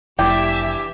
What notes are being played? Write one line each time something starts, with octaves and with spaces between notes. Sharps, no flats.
F1 E3 D4 G4 E5 G5